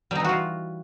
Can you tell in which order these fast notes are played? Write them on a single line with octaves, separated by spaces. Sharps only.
G3 D#4 E3 F#4 F4